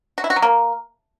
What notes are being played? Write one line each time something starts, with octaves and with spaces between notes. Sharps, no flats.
F#4
E4
F#4
F#3
A#3